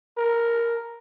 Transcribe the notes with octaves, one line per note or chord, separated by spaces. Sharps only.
A#4